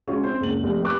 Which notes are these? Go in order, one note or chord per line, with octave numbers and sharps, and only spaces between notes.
G#3 C#4 F4 F#4
C4 C5
F#1 C#2 F#7
F1
G4 B4 D6 F#6